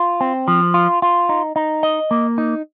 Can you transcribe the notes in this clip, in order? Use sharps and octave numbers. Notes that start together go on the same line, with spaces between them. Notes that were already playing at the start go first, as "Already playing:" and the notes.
Already playing: F4
C4
F3
F4
F4
D#4
D#4
D#5
A#3
D#4